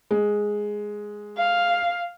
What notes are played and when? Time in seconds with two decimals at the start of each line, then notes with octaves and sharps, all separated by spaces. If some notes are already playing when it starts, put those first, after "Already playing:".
0.11 G#3
1.37 F5